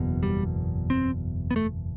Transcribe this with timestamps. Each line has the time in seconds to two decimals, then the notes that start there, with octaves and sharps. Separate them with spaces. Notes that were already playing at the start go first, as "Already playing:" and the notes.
Already playing: F#1 E2 B2
0.23 G3
0.90 C4
1.51 B3
1.56 A3